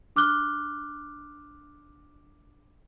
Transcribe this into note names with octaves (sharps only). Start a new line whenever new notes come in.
D4 D6 F6 F#6 G7